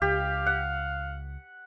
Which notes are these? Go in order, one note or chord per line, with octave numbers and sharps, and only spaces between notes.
C#2 G4 F5
F#5